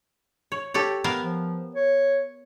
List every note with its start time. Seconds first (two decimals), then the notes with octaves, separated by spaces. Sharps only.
0.52 C#5
0.74 G4 A4 C#5
1.04 B3 A#4 F5
1.20 F3
1.75 C#5